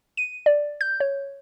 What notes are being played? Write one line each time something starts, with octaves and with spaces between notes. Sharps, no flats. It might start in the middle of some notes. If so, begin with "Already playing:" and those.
D#7
D5
G6
C#5